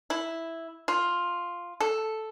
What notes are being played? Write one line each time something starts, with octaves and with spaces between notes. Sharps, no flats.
E4
F4
A4